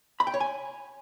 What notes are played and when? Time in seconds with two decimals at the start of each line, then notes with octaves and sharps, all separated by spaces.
0.20 B5
0.27 G5
0.34 C#5
0.40 G#5